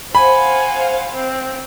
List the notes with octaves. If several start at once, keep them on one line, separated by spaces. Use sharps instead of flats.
C5 F5 F#5 G#5 B5
C4